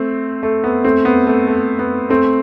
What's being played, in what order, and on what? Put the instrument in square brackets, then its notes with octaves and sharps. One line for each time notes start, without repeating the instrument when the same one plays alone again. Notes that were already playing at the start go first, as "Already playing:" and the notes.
Already playing: [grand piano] A3 C4
A3
B3
A3 C4
B3
A3
A3
B3
A3 C4